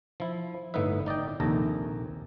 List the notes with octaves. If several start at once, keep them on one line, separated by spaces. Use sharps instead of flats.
F3 E4
G1 A2 B3 D#4 B4 E5
D#4 D5 D#5 G5
A#1 D#2 C3 A4 A#5